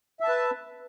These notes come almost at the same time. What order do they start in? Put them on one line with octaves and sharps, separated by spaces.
E5 A5 B4